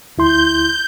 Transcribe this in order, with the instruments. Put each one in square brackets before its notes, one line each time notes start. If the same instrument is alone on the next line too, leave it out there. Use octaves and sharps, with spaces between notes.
[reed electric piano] D2 E4 C6 [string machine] G6